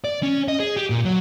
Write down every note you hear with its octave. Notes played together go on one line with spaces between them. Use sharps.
D5
C#4
D#5
G#4
G4
A#2
F#3